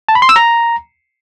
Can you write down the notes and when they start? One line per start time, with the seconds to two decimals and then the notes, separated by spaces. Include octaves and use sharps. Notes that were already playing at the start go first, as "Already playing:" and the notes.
0.09 A5
0.15 B5
0.22 C6
0.29 E6
0.36 A#5